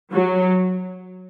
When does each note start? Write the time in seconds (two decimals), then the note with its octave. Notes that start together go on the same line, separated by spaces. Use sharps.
0.12 F#3